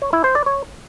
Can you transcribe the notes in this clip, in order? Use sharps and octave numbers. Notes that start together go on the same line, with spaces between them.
C#5
E4
C5
D5
C#5